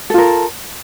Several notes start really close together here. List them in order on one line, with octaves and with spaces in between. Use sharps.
A4 F4 A#4